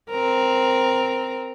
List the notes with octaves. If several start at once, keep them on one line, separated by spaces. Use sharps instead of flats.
C4 A#4